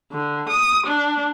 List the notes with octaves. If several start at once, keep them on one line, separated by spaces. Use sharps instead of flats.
D3
D#6
D4